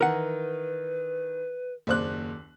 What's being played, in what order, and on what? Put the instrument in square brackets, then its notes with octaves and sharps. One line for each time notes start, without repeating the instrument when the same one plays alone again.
[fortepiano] D#3 E3 [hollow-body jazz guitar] A#4 F#5 [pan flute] B4
[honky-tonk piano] F#1 C5 F#6 [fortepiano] D#2 D5 D6